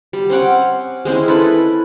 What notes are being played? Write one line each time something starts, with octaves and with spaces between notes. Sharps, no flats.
G3
C4 C#4 F#5 D6
G#3 C4 C#4 E4
E4 A4 B4 B5